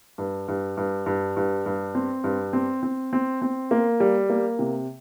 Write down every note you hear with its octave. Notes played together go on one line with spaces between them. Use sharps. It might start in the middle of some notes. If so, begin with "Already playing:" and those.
G2
G2
G2
G2
G2
G2
C4
G2
C4
C4
C4
C4
A#3
G3
A#3
C3